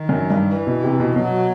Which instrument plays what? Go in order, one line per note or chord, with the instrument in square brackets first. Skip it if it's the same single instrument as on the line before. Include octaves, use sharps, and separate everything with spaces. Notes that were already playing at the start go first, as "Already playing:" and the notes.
Already playing: [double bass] D#3
[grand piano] F#2
G2
[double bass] E3
[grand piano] B2
C3
B2
[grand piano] B2 [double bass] F#3